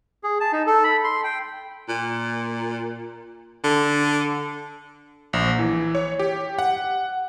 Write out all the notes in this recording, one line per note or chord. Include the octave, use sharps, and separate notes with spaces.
G#4
A5
D#4
A4
B5
C6
G5
A#2
D3
A#1
E3
C#5
G4
F#5